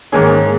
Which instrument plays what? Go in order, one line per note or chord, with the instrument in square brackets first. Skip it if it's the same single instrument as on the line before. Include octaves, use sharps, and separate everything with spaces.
[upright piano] G#2 D#3 A#3 C#4 G#4